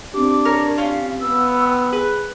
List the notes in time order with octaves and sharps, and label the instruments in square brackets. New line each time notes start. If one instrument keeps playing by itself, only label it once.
[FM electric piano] C4 G4 [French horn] D4 [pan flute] D6
[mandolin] A#4 C#5
[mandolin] C#4 F4 [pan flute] F5
[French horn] B3 [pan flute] E6
[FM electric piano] G5 C6 C#6
[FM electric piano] G#4 [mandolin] B4